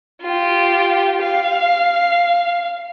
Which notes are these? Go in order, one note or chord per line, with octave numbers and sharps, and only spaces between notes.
F4 G4
F5